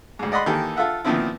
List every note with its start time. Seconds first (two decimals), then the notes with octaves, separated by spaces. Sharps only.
0.19 D2 G#2
0.32 D5 D#5 F#5 B5 C6
0.46 D#3 E3 A#3 G4 A4
0.76 F4 A4 E5 F#5
1.05 A#2 D#3 F3 B3 C4 E4